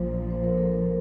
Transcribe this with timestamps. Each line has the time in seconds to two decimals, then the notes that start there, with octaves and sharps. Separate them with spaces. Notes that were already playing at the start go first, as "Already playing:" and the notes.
Already playing: A#1 A#2 F3 F4 C5
0.30 C5
0.44 A#4
0.57 A4
0.71 A#4